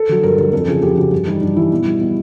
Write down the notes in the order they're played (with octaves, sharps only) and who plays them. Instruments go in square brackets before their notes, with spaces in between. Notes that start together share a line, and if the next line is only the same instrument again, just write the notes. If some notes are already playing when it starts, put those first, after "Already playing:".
Already playing: [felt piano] A4
D3 F#3
G2 A#4
D3 F#3 A#4
F2 A4
C#3 F3 G#4
F2 G4
C#3 F3 F#4
G2
E3 G3 D#4
G2 D4
E3 G3 E4
B2
G3
B2